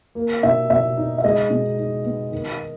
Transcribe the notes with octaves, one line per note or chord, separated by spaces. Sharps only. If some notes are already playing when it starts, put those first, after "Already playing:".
A#3
B2 E5
B2 E5
D#4
E5
G#3 D#5
B2
D#4
B3
D#3